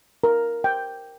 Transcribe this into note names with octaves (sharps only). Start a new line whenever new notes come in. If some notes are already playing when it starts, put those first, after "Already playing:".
A#4
G5